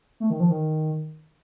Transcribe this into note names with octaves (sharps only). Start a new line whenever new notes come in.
A3
D#3
F3
D#3